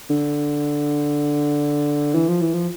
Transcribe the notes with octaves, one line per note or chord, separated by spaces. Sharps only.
D3
E3
F3
E3
F3